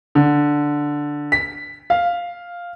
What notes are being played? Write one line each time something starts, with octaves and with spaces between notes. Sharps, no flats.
D3
B6
F5